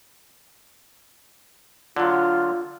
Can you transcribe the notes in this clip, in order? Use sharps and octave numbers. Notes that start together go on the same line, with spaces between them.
D3 F#3 F4